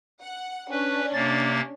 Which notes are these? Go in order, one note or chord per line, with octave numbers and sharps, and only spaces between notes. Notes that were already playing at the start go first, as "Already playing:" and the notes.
F#5
C#4 D4 B4
C3 A#3 A6